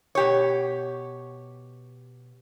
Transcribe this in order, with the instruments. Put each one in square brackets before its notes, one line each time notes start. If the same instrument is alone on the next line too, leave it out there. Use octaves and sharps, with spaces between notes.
[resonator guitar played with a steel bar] B2 G4 C#5